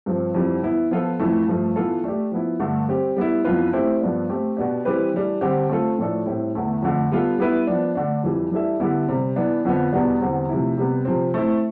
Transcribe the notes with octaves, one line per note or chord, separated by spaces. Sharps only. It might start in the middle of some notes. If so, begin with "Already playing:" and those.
G2 F3 C4
F2 E3 G3 C4
E3 B3 E4
F3 B3 F4 A4
F2 E3 A3
G2 F3 A3
E3 B3 F4 A4
A3 D4 G4
F3 B3 E4
G2 D3 A3
G3 C4 G4
G3 B3 E4
F2 E3 B3 F4 B4
A3 C4 E4 G4 C5
G2 F3 B3 D4
A3 C4 G4 C5
B2 B3 D4 G4
E3 G3 C4 G4 B4
E3 G3 D4
D3 G3 C4 G4
A3 C4 F4 A4
A2 F3 A3 D4 A4
A2 G3 C4 E4
E2 D3 A3 E4
F2 D3 A3
G3 B3 F4 A4
G3 B3 E4 B4
F3 B3 D4
D3 A3 D4
F2 E3 G3
E3 G3 D4 A4 E5
D3 G3 B3 E4
C3 G3 C4
E3 B3 D4
F2 D3 F3 B3
E2 B2 G3 B3 D4
E2 D3 G3 C4
C3 F3 A3 E4
C3 G3 B3
C3 F3 C4
A3 C4 E4